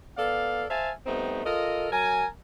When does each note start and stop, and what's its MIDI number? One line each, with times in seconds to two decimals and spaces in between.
0.17 0.64 59
0.17 0.64 69
0.17 0.64 74
0.17 0.64 77
0.68 0.91 72
0.68 0.91 76
0.68 0.91 77
0.68 0.91 80
0.68 0.91 81
1.06 1.41 55
1.06 1.41 57
1.06 1.41 59
1.06 1.41 60
1.06 1.41 63
1.45 1.89 65
1.45 1.89 69
1.45 1.89 70
1.45 1.89 75
1.92 2.25 54
1.92 2.25 70
1.92 2.25 80